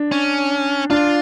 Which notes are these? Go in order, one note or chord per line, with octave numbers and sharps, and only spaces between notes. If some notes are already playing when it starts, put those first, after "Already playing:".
Already playing: D4
C#4
D4 F4